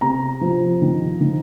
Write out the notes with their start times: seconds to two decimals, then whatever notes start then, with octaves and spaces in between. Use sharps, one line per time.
0.01 C3 A#5
0.41 F3
0.82 D#3
1.21 D#3